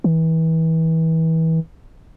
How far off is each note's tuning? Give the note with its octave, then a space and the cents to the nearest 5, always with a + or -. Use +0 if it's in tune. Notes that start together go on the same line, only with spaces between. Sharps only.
E3 -30